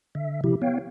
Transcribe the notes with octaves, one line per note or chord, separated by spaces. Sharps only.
D3 E5
C3 F3 E4 G4
B3 C#5 F5 G5